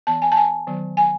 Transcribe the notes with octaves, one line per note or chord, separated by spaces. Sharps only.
E3 B3 A5
G#5
A5
G#5
D#3 F#3 B3
G#5